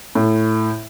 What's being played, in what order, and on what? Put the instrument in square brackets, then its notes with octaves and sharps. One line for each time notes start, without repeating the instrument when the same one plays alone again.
[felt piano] A2